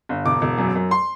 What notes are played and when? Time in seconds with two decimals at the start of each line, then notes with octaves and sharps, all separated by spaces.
0.09 G1
0.25 E1 D6
0.42 E1
0.58 F#2
0.75 F#2
0.91 C6